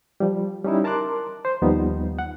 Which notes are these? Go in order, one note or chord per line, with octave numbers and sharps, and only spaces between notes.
F3 G3
G3 C#4 D#4 E4
A#4 A5 A#5 C6 D6 F#6
C5
D#2 F3 G3 B3 D#4
F#5